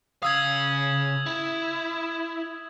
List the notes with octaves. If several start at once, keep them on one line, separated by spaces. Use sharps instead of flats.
C#3 F5 D#6 E6 G#6
E4